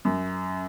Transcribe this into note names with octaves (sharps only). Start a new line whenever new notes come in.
F#2